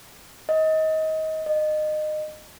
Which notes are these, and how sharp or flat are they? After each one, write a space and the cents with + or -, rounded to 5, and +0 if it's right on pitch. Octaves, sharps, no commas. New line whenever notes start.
D#5 +25
D#5 -25